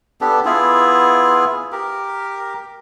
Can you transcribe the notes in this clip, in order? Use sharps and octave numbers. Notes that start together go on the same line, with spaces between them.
B3 D4 G4 A4
B3 E4 F4 G#4
G4 A#4